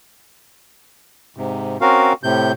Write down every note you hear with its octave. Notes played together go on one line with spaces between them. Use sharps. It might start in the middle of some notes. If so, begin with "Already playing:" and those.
G#2 C3
C4 C#4 F#4 A#4 F5
A2 C3 G6